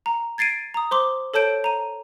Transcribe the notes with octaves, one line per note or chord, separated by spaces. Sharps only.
A#5
G#6 A6 C7 D7 D#7
A#5 D#6
C5 C6 D6
A4 C#5 A5 G6 D7
A#5 D#7